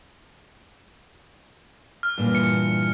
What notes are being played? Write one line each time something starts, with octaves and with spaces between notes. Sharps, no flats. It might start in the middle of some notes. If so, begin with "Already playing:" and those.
F6
G2 A#2 E3
C#7